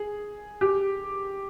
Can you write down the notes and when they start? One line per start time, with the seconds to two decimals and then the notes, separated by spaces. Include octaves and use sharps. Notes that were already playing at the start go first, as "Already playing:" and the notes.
Already playing: G#4
0.61 G4